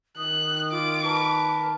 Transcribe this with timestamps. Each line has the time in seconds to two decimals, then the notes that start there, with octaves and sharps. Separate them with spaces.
0.17 D#3 D#6 F#6
0.72 F4 D6
1.04 A#4 B4 A5